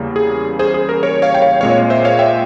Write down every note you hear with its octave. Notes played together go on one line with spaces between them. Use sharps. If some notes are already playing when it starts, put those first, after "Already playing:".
Already playing: E2 C#3 G3 A#3
G#4
G#4 C5
G#4
A#4
A#4 C#5
C#5 F5
G5
C#5 F5
A#2 G#3 C4 C#5 F5
C5 E5
C#5 F5
E5 G5